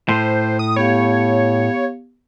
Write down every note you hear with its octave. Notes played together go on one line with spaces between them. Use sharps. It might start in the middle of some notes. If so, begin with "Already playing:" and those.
A2 C5
D#6
B3 G4 C#5 F5